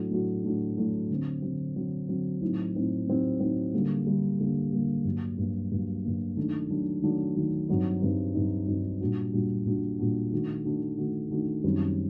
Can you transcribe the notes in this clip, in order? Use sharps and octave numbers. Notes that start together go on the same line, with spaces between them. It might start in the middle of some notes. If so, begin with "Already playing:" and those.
Already playing: A2 F#3 A3 D4 F#4
A2 F#3 A3 D4 F#4
A2 F#3 A3 D4 F#4
A2 F#3 A3 D4 F#4
D3 F#3 C4
D3 F#3 C4
D3 F#3 C4
D3 F#3 C4
A2 F#3 C4 D#4
A2 F#3 C4 D#4
A2 F#3 C4 D#4
A2 F#3 C4 D#4
D3 G3 A#3
D3 G3 A#3
D3 G3 A#3
D3 G3 A#3
G2 F#3 A#3
G2 F#3 A#3
G2 F#3 A#3
G2 F#3 A#3
D#3 F#3 A3 D4
D#3 F#3 A3 D4
D#3 F#3 A3 D4
D#3 F#3 A3 D4
G2 F#3 C4 D#4
G2 F#3 C4 D#4
G2 F#3 C4 D#4
G2 F#3 C4 D#4
A#2 G3 D4 F#4
A#2 G3 D4 F#4
A#2 G3 D4 F#4
A#2 G3 D4 F#4
D#3 A3 D4 F#4
D#3 A3 D4 F#4
D#3 A3 D4 F#4
D#3 A3 D4 F#4
F#2 D#3 G3 C4